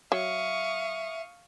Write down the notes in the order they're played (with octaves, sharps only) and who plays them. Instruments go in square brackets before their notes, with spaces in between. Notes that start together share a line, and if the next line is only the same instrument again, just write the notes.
[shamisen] F#3 [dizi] E5 [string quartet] F5 C#6 D#6